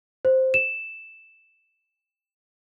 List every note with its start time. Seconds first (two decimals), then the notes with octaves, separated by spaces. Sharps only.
0.25 C5
0.54 E7